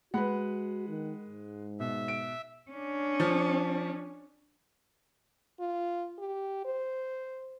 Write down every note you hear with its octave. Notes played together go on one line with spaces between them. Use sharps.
G#3 F#4 B4 F#5 B5
D#3
G#2
B2 E5
D7
C#4 D4
F3
F4
G4
C5